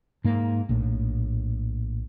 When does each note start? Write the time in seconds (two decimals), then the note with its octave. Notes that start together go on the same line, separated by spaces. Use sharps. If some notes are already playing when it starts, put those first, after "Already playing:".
0.24 G#2 A#3
0.69 A#1 A2